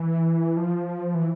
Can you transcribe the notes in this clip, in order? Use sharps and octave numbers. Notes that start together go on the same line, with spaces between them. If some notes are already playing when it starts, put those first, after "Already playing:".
Already playing: E3
F3
E3